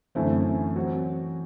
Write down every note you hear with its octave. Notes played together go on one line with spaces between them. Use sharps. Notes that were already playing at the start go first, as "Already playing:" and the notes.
F#2 D3 E3 A3 C4 E4
F#3 C4 F#4